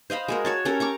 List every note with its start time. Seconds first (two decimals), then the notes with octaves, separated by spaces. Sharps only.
0.10 C5 D#5 F5 B5
0.28 G#3 F#4 A#4
0.45 F#4 C#5 A5
0.65 C#4 G4 A4 A#4
0.80 A#5 C#6 D6